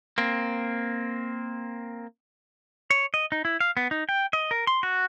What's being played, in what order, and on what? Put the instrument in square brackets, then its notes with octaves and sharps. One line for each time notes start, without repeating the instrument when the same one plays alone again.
[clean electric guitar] A#3 C4
[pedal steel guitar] C#5
D#5
D#4
E4
F5
B3
D#4
G5
D#5
A#4
C6
F#4